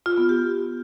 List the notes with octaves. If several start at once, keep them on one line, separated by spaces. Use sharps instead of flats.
F4
B3
G4